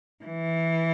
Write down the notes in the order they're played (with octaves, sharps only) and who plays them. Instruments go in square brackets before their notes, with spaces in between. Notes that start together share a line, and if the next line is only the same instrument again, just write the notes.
[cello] E3